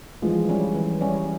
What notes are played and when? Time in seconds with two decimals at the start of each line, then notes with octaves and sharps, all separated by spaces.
0.22 E3 F3 G#3
0.49 G3 C#4
0.75 E3
1.01 G3 C#4